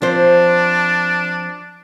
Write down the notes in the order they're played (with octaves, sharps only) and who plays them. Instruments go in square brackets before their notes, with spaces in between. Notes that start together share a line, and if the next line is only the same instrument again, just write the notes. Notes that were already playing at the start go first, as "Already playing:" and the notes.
[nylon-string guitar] F3 C4 C5 [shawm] D4